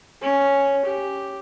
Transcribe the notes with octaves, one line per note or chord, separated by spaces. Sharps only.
C#4
G4